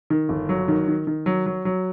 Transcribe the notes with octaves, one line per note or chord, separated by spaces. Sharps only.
D#3
G1
F#3
D#3
D#3
D#3
F#3
F#3
F#3